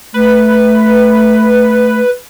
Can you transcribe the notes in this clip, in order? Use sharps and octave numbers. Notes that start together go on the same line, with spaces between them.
A3 B4